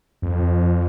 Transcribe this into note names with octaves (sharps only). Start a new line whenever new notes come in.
F2